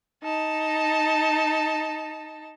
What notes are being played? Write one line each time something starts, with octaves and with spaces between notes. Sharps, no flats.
D#4 A5